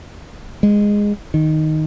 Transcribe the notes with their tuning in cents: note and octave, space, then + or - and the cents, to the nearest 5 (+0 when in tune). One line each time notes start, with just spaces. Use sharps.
G#3 -10
D#3 +0